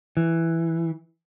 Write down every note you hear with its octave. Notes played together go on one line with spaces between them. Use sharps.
E3